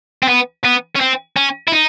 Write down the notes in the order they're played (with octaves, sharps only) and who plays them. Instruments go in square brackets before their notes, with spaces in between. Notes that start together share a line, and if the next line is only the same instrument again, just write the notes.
[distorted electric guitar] C4
B3
B3
C#4
C4
C#4
E4
D#4